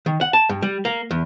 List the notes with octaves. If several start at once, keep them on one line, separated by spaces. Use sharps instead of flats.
D#3
F#5
A5
G2
G3
A#3
E2